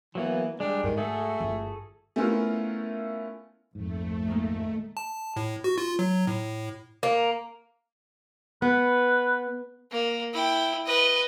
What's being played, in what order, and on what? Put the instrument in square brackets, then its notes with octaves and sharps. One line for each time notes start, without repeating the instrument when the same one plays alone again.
[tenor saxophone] E3 [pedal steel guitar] F#3 A#3 B3
[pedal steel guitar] G3 G#3 [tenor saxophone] D4
[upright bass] G#2 [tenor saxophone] D#3
[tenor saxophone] A3 [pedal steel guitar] F#4 G#4 A4
[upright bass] G1
[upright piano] A3 B3 C#4 E4 F4 A#4
[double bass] A#1 [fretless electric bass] F2 G#2 [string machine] A3
[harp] D#3 G#3 A#3
[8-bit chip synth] A5
A2
F#4
F4
F#3
A2
[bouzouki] A#3
[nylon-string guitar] B3 [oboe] B4
[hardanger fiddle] A#3
E4 G5
B4 D#5